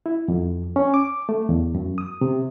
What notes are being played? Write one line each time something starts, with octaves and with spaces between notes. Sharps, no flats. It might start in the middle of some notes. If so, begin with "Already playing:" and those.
E4
F2
C#4
D6
A3
E2
F#2
D#6
C3